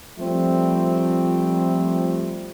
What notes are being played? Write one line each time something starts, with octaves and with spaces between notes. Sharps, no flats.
F3 G3 A3 C4